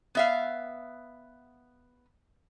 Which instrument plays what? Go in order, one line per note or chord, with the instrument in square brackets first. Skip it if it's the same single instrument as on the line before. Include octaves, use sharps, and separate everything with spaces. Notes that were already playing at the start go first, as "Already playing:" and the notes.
[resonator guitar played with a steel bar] B3 E5 F5